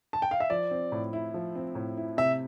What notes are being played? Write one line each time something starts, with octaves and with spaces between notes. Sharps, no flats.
A5
G5
F5
E5
F3 D5
C4
A2
E4
F3
C4
A2
E4
C3 E5